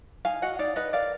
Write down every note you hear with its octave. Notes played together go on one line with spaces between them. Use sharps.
D#4 F5 G#5
F#4 D#5 F#5
D#4 D5 F5
D#4 B4 D#5
A#4 D5 F5